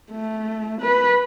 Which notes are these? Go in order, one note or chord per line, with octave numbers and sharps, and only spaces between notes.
A3
B4